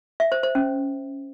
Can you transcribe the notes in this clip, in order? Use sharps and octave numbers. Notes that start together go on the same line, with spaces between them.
E5
C5
C5
C#4